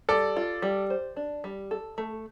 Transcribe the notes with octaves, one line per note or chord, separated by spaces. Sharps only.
G3 A4 D5
F4
G3
C5
D4
G3
A4
A3